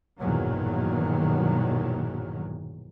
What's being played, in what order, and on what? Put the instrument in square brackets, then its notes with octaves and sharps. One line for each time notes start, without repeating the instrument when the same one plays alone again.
[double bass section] A#1 E2 G2 B2 D#3 F#3